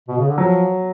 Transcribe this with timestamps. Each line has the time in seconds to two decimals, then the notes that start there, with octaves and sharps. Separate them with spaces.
0.08 B2
0.18 C#3
0.28 D3
0.38 F3 F#3